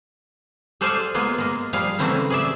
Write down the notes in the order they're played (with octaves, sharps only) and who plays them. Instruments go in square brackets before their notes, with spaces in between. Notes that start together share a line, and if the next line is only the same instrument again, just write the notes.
[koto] G#4 A4 C5 D5 F5 G#5
G#3 A#3 B3 F4 G#4
G#3 A#3
F3 G3 G#4 F5
C#3 E3 F#3 A3 C4 E4
G#4 D5 E5